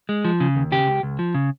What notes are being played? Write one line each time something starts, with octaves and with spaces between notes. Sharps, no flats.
G#3
F3
C#3
D#2
C#3 G4
C#2
C#2
F3
C#3